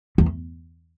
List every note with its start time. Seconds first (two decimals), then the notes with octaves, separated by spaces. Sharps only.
0.18 E2